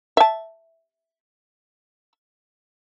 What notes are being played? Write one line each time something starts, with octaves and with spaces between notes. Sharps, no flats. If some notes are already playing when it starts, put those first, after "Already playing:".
E5 A5